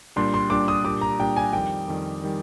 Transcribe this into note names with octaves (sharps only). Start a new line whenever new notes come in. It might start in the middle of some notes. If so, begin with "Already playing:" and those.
A#2 G3 D4 G4 C6
C6
A#2 G3 D4 G4 D6
D#6
A#2 G3 D4 G4 D6
A#5
A#2 G3 D4 G4 G5
G#5
F2 D#3 G3 G5
F2 D#3 G3
D#3 G3